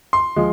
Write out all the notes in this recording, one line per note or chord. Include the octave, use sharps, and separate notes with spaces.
C6
F3 G#3